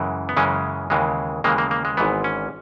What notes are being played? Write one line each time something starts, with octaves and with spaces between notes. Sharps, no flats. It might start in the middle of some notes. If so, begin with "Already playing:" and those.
Already playing: F#2 C#3 E3 G#3
B3
F#2 C#3 E3 G#3 C#4
D#2 C#3 E3 G#3
D#2 C#3 E3 G#3 A#3
A#3
A#3
G#3
G#1 G#2 E3 B3
C#4